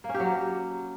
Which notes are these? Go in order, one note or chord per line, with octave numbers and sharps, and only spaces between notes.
A#3
C#4
G4
F#3